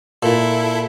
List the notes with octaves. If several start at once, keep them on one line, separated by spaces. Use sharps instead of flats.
A#2 E4 A4